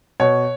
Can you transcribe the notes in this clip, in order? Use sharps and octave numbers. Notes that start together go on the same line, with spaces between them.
B2 C#5